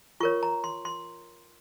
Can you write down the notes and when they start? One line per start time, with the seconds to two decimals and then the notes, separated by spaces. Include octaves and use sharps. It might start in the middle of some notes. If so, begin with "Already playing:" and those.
0.20 F4 A#4 C#5 C#6
0.43 A#5
0.64 C6
0.85 C6